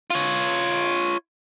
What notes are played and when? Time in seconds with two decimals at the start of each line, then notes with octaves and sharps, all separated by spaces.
0.10 F4 C#5